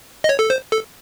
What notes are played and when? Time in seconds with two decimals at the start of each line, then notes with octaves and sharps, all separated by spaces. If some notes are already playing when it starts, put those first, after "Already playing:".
0.24 D#5
0.29 C#5
0.39 A4
0.50 C5
0.72 A4